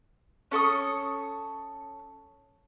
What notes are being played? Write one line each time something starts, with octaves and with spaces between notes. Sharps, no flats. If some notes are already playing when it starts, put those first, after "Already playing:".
C#4 A4 C#6 D#6